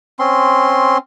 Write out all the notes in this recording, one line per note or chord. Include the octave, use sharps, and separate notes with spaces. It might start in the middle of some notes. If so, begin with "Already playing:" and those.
C4 C#4 C6